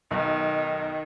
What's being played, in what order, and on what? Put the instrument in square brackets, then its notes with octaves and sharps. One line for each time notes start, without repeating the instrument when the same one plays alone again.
[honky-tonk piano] B1 [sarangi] D#3